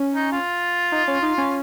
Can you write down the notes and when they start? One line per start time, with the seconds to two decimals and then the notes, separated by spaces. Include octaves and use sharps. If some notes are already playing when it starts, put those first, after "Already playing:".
Already playing: C#4
0.13 D#4
0.32 F4
0.92 D#4
1.08 C#4
1.22 D#4
1.38 C#4